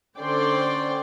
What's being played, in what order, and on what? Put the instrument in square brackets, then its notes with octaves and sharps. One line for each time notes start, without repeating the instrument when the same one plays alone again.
[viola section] D3 C#4 C5 D5 G5 C6